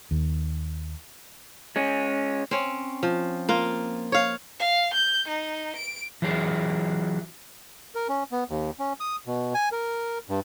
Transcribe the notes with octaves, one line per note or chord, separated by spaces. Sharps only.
D#2
G#3 C#4
C4 C#4
F3
A#3 F4
C#5 F5
F5
G6
D#4
D7
E3 F#3 G#4
A#4
C#4
B3
D#2
C#4
D#6
B2
G#5
A#4
G2